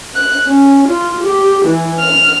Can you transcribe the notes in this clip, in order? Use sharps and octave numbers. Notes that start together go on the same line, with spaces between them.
F#6
C#4
F4
G4
E3
F6